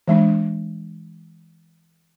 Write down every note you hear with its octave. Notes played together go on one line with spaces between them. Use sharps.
E3 G#3 D4